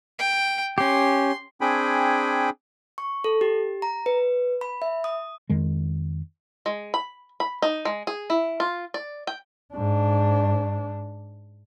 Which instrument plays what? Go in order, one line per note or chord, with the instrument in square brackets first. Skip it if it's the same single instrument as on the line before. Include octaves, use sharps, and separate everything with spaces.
[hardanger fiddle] G5
[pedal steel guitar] C#4 G4 [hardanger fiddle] C6
[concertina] C4 D4 G#4 G5 G#5 B5
[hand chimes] C#6
A4
G4
A#5
B4
B5
E5
D#6
[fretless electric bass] F2 D#3 G#3
[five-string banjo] G#3
B5
B5
D#4
G#3
G#4
E4
F4
D5
G5
[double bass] G#2 D4